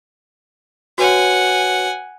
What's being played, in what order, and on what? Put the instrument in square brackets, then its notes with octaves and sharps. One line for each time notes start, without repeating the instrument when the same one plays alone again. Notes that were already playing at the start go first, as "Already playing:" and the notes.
[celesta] F#4 B4 C#5 [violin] F#5 G#5